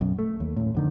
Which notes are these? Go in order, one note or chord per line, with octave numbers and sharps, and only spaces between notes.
B1 F#2
A3
D#2
A1 A2
F2 D3 D#3